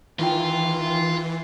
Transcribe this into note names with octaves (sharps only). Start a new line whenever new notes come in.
E2 D#3 E3 F4 G5